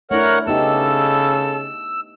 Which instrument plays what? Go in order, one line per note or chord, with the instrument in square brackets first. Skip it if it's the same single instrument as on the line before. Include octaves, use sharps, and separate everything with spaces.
[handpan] A3 D4 E4 [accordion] A#4 C#5 F#5
[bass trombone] C#3 [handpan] B3 D#4 G4 [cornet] A4 [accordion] E6